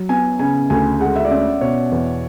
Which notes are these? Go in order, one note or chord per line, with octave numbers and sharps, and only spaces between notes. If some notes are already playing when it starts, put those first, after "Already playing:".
Already playing: F#3
B3 G#5
C#3 G#5
D2 G#5
G#3 F#5
E5
D5
C#4 E5
B2 C#5
E2